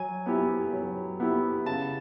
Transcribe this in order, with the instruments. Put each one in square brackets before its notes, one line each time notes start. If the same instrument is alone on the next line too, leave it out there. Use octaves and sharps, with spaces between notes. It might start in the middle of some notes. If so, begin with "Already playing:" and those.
Already playing: [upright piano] F#3 [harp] G#5
[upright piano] B3 E4 G4
F#3
B3 E4 G4
[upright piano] C#3 [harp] A5